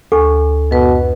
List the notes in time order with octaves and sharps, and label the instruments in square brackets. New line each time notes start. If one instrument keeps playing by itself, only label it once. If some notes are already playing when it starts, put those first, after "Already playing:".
[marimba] D2 G#5 C#6 [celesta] A4
[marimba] F#2 B4 [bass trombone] B2